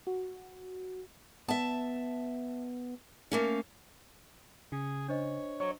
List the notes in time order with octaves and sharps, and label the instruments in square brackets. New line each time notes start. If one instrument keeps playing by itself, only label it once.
[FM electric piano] F#4
[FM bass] B3 [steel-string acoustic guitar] E5 A5
[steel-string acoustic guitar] A3 A#3 C#4
[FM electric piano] C#3 [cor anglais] G#4
[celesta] D4 C5 D#5 [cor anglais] C#5
[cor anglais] F#3 [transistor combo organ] C#5